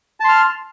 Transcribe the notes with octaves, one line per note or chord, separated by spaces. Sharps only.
A5 C6 F6